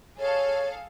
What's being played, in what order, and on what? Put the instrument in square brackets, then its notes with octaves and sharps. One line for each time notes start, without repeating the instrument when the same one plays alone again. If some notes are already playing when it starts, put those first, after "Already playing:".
[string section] G#4 A4 F5 [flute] C#5